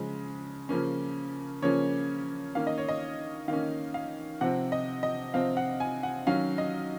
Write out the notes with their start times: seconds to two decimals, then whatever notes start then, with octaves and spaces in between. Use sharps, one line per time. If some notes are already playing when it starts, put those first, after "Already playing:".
Already playing: C#3 F3 G#3 C#4
0.69 C#3 F3 A#3 C#4
1.62 C#3 F3 A#3 C#4 C#5
2.55 D#3 A#3 C#4 F5
2.67 D#5
2.78 C#5
2.89 D#5
3.48 D#3 A#3 C#4 F5
3.94 F5
4.41 C3 F3 C4 F#5
4.72 D#5
5.03 D#5
5.34 C3 F3 C4 F5
5.57 F#5
5.80 G#5
6.03 F#5
6.27 D#3 F#3 C#4 F5
6.58 D#5